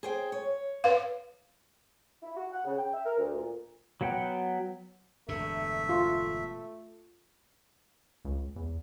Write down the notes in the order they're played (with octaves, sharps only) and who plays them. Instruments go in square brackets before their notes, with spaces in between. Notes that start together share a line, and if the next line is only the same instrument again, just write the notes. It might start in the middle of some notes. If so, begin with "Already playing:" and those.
[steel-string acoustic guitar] G#4 C5 G5
C#5
[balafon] B4 F5
[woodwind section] E4
F#4
F#5
C#3
G5
E5
A#4
D2
A#2
[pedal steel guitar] F#3 B3 F#5 G5
[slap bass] E1 G2 D3 [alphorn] A3 [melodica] E5
[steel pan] F4
[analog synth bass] C#2
E2